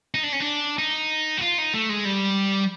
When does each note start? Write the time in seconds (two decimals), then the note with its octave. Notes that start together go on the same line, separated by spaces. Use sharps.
0.15 D#4
0.23 D4
0.32 C#4
0.40 D4
0.78 D#4
1.37 F#4
1.41 F4
1.58 D#4
1.74 A3
1.89 G#3
2.05 G3